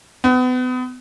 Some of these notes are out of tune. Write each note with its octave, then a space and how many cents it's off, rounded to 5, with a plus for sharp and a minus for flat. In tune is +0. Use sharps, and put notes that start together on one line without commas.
B3 +35